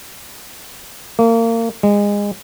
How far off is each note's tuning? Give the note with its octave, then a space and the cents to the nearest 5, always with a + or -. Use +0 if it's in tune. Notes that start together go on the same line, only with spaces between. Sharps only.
A#3 -30
G#3 -25